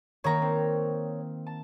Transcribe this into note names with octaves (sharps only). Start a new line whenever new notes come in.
D#3 A#3 C#5 A#5
C4
A5